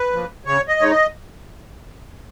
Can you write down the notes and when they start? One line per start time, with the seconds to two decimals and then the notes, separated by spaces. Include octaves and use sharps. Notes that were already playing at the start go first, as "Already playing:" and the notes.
Already playing: B4
0.13 F3 A#3
0.46 C#3 C#5
0.68 D#5
0.80 G#3 D#4 C#5
0.91 D#5